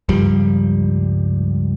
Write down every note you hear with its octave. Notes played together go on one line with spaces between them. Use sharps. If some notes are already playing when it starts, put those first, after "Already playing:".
C#2 G2 F3 G3